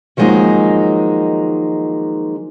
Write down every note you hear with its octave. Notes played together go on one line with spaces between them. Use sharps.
D#3 F3 F#3 G#3 A#3 D#4